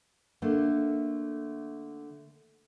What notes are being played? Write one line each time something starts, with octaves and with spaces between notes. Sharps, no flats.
D3 A3 A#3